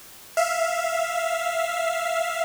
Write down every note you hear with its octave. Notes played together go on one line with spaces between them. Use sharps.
E5 F5